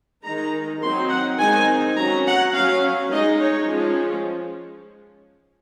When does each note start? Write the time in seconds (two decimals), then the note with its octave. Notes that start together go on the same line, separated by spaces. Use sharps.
0.24 D#3 G#3 D#4 A#5
0.82 F#3 C4 D#4 C6
1.10 F#5
1.39 D#3 G#3 C4 D#4 G#5
1.97 F#3 C#4 A#5
2.26 F#5
2.54 F#3 C#4 F5
3.11 G#3 D#4 D#5
3.41 C#5
3.69 F3 G#3 C#4